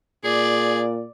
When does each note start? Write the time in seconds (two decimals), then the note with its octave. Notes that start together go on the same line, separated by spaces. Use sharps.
0.24 A#2 G#4 D5